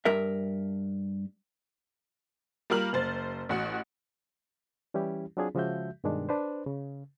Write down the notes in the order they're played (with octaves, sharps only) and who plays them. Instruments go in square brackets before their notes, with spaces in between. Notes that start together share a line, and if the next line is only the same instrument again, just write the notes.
[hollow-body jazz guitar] G2 A#4 E5
[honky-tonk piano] G3 A#3 F4 A#4 F6 F#7
F#1 C5 A6
A1 F#4 F#5
[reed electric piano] E3 G3 C#4 E4 G4
F#3 C4 D4 F4 G#4
C#3 F3 G#3 F#4 E5 G6
G2 B2 D#3 G#3 D4
D4 B4 C5
C#3